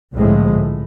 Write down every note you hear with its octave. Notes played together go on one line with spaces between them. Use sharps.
C2 A2 D3 F3 G#3
A2